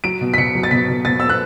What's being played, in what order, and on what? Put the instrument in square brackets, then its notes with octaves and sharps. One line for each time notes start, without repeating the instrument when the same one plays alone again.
[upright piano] F#3 D7
B2
B6
B2 C#7
F#3
A6
B2 B6
B2
B2 A6
B3 E6
F#6